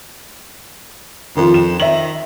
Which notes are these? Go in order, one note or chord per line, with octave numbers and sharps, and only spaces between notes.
F2 D#3 F4
E7
D#3 E5 F#7